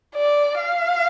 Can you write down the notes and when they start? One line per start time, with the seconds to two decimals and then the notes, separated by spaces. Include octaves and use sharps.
0.15 D5
0.59 F5